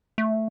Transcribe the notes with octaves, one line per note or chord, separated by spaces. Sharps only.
A3